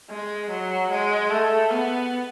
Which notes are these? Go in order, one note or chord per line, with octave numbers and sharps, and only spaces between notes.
G#3
F#3
G#3
A3
B3